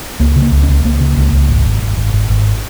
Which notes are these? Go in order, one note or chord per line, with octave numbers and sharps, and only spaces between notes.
C#2 A#3
C#3
A#3
C#2
C#4
C#2
C#2 A#3
C#3
C#2
C#2
G#1
G#1
G#1
G#1
G#1
G#1